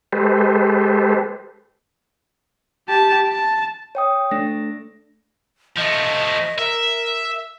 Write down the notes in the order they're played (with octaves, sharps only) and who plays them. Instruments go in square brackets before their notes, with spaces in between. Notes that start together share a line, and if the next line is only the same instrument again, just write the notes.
[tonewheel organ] G#3 G4 A4 B4 C5
[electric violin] G4 A5
A5
[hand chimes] C#5 G5 D#6
[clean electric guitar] A3 D4 [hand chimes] A#6
[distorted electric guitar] F3 A3 [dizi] D#5
[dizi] A#4 [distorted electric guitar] E5